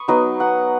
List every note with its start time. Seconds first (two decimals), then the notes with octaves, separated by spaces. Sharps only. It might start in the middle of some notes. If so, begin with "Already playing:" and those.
Already playing: B5 C#6 D#6
0.08 F#3 B3 D#4 D#5
0.40 F#5